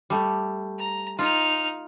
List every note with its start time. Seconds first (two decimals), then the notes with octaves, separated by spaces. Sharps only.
0.10 G3 A3
0.79 A#5
1.19 D#4 F4 F6